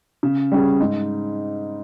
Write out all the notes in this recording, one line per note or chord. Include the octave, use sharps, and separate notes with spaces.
C#3
G3 C#4 G#4
G#2